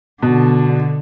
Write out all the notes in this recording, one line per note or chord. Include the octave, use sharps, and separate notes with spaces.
B2 D3